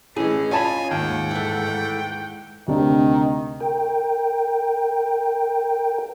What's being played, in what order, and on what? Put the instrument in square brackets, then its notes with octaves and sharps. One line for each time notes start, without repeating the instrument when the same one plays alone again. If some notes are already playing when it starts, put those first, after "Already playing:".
[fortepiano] A2 E3 [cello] C#4 D#5 [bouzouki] G#4
[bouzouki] F4 [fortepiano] C#5 A5 B5 [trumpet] G#5
[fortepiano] D#2 [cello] G#2 F#5 [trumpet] G5
[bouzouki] E3 A3
[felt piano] D2 C3 D4 [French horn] D#3
[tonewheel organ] A#4 G5